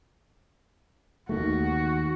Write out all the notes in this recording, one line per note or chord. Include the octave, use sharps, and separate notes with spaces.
D#2 D#3 A3 F#4